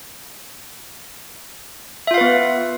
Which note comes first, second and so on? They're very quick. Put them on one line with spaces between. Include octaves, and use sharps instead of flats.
E5 F4 F5 B4 B3